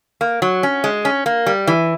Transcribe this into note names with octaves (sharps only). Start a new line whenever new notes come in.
A#3
F#3
C#4
G#3
C#4
A#3
G3
E3